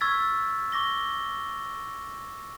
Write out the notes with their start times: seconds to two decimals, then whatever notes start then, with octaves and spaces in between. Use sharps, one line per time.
0.01 C#6 E6 F6 G#6 A6 B6
0.72 C#6 D6 A#6 G7